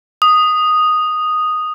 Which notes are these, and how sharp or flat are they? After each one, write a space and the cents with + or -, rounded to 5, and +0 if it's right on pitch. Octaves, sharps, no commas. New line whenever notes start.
D#6 -5